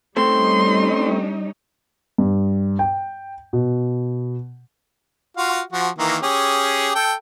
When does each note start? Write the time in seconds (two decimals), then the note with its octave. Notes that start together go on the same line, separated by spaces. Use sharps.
0.17 G3 A3 C4 C#4 D#4 C6
2.18 G2
2.79 G5
3.53 B2
5.37 F4 F#4 F5
5.73 F3 F#4
5.99 D#3 E3 A#3
6.23 C#4 G4 G#4
6.95 A4 G5